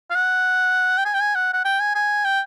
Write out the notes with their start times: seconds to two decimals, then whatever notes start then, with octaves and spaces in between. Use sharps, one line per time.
0.10 F5
0.15 F#5
0.98 G5
1.05 G#5
1.14 G5
1.20 G#5
1.35 F#5
1.53 F#5
1.65 G5
1.80 G#5
1.95 G#5
2.25 G5